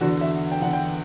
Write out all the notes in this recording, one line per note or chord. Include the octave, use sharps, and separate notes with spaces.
E2 D3 F#4
E5
G5
E2 D3 F#5
G5